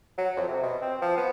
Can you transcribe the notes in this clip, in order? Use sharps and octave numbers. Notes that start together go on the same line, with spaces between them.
F#3
F2
C3
B2
C4
F3
B3